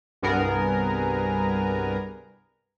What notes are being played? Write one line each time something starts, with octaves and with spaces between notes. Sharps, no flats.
C2 G2 B3 G#4 A#4